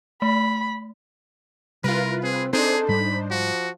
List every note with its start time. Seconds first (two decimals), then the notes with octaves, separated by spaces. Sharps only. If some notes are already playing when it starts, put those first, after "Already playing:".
0.22 A3 B5
1.84 C3 G3 E4 F4 A#4 B4
2.23 C4 G#4
2.53 C4 D4 D#4 G#4 A4 C5
2.89 G#2 G3 B5
3.30 F3 F#4